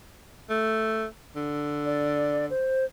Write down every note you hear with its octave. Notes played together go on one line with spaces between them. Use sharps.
A3
D3
D5
C5